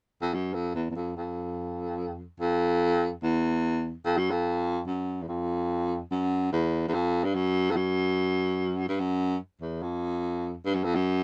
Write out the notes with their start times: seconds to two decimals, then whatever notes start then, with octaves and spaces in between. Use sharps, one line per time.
0.22 F2
0.34 F#2
0.54 F2
0.75 E2
0.90 E2
0.95 F2
1.16 F2
2.40 F2
3.23 E2
4.05 F2
4.17 F#2
4.31 F2
4.87 F#2
5.22 E2
5.28 F2
6.11 F#2
6.52 E2
6.88 E2
6.94 F2
7.24 G2
7.35 F#2
7.71 F2
7.76 F#2
8.89 G2
9.00 F#2
9.61 E2
9.82 F2
10.65 G2
10.74 F#2
10.84 F2
10.95 F#2